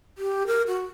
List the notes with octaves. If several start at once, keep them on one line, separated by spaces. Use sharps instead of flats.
G4
A#4
F#4